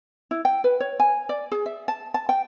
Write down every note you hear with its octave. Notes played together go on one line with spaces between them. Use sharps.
E4
G5
B4
C#5
G#5
D5
G#4
E5
A5
A5
G5